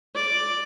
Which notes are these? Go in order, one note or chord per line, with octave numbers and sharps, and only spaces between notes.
D5